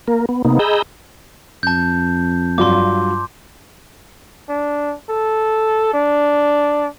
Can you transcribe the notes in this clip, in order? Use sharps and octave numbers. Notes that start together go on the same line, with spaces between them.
A#3 A#4
B3
C3 A#3 B3 D#4
G#4 D#5 A#5 B5 E6 G6
F2 A5 G6
G2 F#3 F4 C6 D6
D4
A4
D4